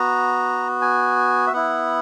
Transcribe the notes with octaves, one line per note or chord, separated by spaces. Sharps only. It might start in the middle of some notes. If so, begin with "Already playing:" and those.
Already playing: B3 F#4 A#5
G#5
E5
B3 E4 F#5